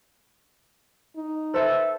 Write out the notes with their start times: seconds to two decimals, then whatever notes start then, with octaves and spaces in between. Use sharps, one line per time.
1.17 D#4
1.54 A4 B4 C5 E5